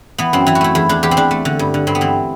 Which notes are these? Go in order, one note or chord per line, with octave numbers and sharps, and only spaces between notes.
E3 B3
F#2 C4
E3 E4
F#4
A3 E4
E2 E4
E2 D4
E2 G4
C4
E2 D4
A3
D3
G2
D3
G2 C4
B3
E3 C4